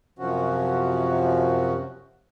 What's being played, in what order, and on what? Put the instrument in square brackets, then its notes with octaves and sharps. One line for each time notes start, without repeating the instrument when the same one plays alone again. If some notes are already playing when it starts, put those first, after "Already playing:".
[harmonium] F#2 C3 F3 C#4 F#4